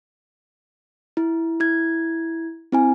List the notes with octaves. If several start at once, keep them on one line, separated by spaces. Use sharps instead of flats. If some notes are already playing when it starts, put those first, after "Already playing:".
E4
E4 G#6
C4 E4 G#5